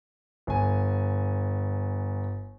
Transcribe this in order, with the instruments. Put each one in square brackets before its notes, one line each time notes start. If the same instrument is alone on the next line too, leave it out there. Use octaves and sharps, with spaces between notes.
[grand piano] G1 G#5